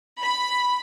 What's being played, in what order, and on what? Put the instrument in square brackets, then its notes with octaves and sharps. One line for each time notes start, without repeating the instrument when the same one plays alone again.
[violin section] B5